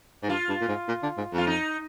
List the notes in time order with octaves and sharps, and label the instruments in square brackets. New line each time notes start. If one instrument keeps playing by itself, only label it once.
[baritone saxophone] G#2
[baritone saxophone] G2 [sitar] F4
[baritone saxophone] G2
A#2
G#2
A#2
D3
G#2
F2
[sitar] F4
D#4